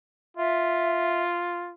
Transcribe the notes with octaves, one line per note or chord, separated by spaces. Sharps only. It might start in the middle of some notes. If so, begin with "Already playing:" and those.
F4 E5